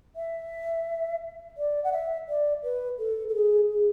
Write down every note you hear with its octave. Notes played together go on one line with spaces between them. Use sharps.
E5
D5
F#5
E5
D5
B4
A4
A4
G#4
G#4